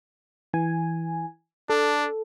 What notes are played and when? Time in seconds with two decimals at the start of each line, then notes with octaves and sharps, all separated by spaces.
0.53 E3 G#5
1.70 D4 A4